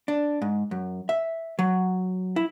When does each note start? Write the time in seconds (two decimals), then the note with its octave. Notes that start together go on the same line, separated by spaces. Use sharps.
0.08 D4
0.42 G#2
0.71 F#2
1.09 E5
1.59 F#3
2.36 E4